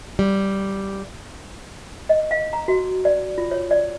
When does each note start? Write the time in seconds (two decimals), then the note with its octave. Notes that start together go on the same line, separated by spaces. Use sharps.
0.19 G3
2.09 D#5
2.31 F5
2.53 A#5
2.68 F#4
3.05 D5
3.38 F4
3.51 C#5
3.71 D5